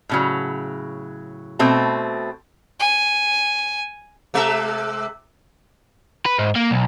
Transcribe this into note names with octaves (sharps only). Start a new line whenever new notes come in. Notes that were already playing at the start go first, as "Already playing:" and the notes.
A2 C#3 F#3
B2 A3 C4 A5
G#5
C3 G#3 E5
B4
G#2
A#3
B1